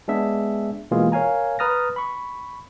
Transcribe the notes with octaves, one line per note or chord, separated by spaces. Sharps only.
G#3 B3 D4 G#4 E5
B2 E3 G#3 A#3 F4 G#4
A#4 C#5 F5 G#5 A#5
B4 A#5 D#6 F6 A6 A#6
B5 C#6